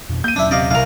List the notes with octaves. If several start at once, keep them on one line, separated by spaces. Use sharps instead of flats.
F2 B2
A#3 G6 D#7
D#1 F#3 C#4 D4 E4
C3 D5 D#5 F5
C2 A#4 F5 F7